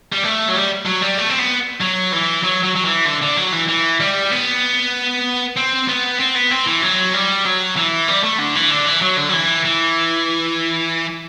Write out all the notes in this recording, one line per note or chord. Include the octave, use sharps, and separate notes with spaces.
G3
A3
F#3
G3
F#3
G3
A3
C4
B3
F#3
E3
F#3
F#3
F#3
E3
D3
D3
F#3
E3
E3
G3
B3
C4
B3
C4
B3
C4
E3
F#3
G3
F#3
E3
G3
A3
D3
E3
D3
E3
F#3
D3
F#3
E3
E3